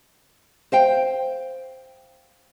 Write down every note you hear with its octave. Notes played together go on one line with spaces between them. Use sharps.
C5 F5 G5